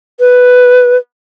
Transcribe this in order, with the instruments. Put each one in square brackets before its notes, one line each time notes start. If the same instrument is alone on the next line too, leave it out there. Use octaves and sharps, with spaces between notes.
[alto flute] B4